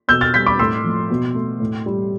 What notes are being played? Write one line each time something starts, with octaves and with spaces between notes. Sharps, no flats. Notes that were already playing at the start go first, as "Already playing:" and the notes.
B2 E6 G6
F6 A6
G3 G6 B6
B5 D6
A2 C6 E6
F3 A3
B2
A3
A2
G3